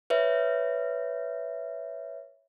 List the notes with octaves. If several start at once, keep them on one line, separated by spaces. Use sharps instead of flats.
B4 C#5 E5